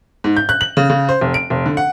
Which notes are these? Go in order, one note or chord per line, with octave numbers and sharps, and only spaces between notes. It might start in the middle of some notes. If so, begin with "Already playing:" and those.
G#2
G6
F#6
F#7
C#3
C#3
C5
F1
D7
F1
D3
F#5